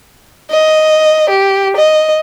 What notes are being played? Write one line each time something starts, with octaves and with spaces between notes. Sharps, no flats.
D#5
G4
D#5